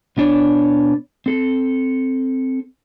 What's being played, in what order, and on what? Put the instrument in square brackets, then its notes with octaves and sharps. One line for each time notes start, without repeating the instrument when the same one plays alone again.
[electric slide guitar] B2 B3 D4 C#5
C4 A4